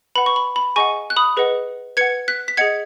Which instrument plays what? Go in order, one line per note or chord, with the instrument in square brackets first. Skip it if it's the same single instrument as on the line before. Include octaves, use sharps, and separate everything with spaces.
[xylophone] B4 F#5 B5
C#6
B5
B5
G#4 D#5 F#5 G#5 C#6
F#6
B5 D#6
G#4 B4 D#5 F#5
B4 F#5 G#6 C#7
F#6 B6
B6
G#4 D#5 F#5 G#6 C#7